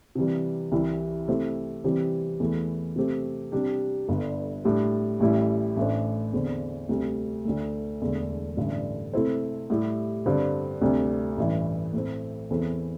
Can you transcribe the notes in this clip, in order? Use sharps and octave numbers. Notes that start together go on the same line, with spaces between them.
C3 E3 G3
C2 C3 E3 G3 E4
C3 A3 E4 G4 C5
C3 E3 G3 C4 G4
E2 E3 A3
C3 A3 C4 G4
C3 G3 D4 G4
G1 G2 D3
A2 G3 D4
A1 A2 G3 E4
A1 A2 A3 D4 C5
E2 D3 C4
D2 C3 G3
D2 D3 A3
E1 E2 D3 A3
A1 G2 D3
C3 A3 E4 A4 C5
A2 G3 E4 G4
G2 D3 C4 G4
D2 C3 G3 D4
A1 G2 E3
A2 A3 C4
E2 E3 C4 A4